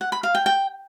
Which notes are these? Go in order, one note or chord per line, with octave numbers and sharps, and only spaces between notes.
F#5
B5
F5
G5
G5